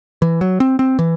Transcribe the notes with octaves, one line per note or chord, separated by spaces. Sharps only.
E3
F#3
C4
C4
E3